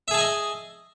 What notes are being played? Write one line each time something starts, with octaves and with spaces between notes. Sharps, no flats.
G#4 D#5 E5 G#5 A5